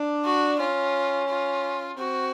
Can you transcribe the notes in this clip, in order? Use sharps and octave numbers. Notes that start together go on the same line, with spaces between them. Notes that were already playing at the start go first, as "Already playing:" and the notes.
Already playing: D4
F#4
C#4 F4
F4
C4 F#4